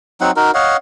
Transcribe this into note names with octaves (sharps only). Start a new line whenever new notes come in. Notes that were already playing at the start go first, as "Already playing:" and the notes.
F#3 C4 D#4 F#5
D#4 F#4 A#4
C#5 D#5 F5 F#5